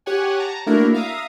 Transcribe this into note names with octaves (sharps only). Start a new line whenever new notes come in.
G4 C#5 F#5 G#5
A5 A#5
A3 A#3 D4 E4 F#4 A#4
E5 F5 A#5 D#6